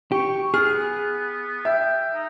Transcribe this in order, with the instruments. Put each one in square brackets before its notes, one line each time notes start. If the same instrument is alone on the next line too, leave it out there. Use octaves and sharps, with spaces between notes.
[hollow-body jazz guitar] G4 [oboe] C#6
[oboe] B3 [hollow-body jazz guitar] G#4 [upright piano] F6
[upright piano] E5 [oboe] G5
[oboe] D#4